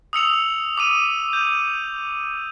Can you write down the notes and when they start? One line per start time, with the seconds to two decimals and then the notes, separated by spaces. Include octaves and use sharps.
0.13 D#6 E6 C#7 F7
0.78 D6 D#6 D#7
1.33 G6